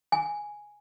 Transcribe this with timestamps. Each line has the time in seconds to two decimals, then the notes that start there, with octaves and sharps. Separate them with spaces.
0.12 G#5